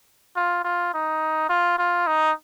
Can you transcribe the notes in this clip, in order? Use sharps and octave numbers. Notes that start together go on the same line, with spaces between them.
F4
F4
D#4
F4
F4
D#4